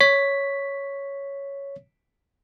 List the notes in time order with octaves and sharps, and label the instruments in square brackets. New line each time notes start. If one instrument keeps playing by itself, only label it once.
[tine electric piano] C#5 B6